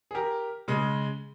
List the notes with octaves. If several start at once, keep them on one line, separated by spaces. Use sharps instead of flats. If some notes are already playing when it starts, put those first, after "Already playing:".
G#4
G4 A#4
C#3 G#3